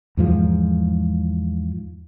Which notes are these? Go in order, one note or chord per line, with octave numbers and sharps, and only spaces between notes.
E2 G#2 F3 G#3